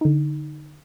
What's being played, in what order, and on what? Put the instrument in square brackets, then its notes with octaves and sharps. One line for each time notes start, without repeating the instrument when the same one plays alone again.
[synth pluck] D3 D#4